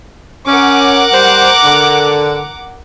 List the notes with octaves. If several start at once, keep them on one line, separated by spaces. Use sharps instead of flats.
C#4 A#4 F#5 D6
G3 C5
D3